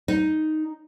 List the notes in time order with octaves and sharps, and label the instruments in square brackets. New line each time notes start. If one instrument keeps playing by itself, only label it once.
[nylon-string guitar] D#4